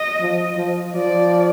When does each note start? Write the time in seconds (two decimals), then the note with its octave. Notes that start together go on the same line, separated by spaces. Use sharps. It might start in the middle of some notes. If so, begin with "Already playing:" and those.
Already playing: D#5
0.21 F3
0.57 F3
0.95 F3 D5